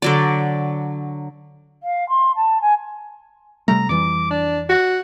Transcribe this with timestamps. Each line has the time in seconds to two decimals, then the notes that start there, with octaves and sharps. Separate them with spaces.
0.02 D3 F#3 D5
1.83 F5
2.09 C6
2.36 A5
2.61 G#5
3.68 C3 G3 A3 A#5
3.89 F2 E3 G3 D6
4.30 D4
4.69 F#4